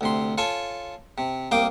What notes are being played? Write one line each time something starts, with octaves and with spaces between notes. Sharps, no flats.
D2 C3 C6
F4 A4 C#5 G#5 A5
C3
C2 A#3 F5 G5 D6 D#6